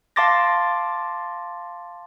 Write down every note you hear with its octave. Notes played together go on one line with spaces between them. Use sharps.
F5 A5 C6 D6 A6 A#6